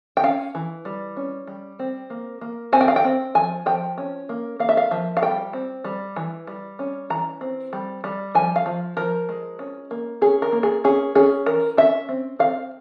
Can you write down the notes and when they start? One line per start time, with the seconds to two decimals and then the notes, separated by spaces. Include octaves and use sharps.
0.17 G5
0.23 C#4 F5
0.55 E3
0.85 G3
1.17 C#4
1.47 G3
1.79 C4
2.10 A#3
2.41 A#3
2.72 C4 G#5
2.81 G5
2.88 F5
2.96 G5
3.04 C4
3.35 F3 G#5
3.66 F3 G5
3.98 C#4
4.29 A#3
4.60 A#3 F5
4.69 E5
4.77 F5
4.91 F3 E5
5.17 F5
5.22 G3 G5
5.53 C4
5.84 G3
6.16 E3
6.47 G3
6.79 C#4
7.10 E3 A#5
7.41 C4
7.73 G3
8.04 G3
8.35 F3 G#5
8.56 F5
8.66 F3
8.97 F3 A#4
9.29 G#3
9.59 C#4
9.91 A#3
10.21 C#4 G#4
10.42 A#4
10.52 A#3
10.63 G#4
10.84 C#4 G#4
11.15 C#4 G#4
11.46 E3 A#4
11.77 C#4 E5
12.09 C4
12.39 C4 F5